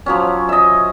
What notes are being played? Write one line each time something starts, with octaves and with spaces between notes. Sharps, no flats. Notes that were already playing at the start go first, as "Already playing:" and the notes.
F3 F#3 C#4
D#5 E5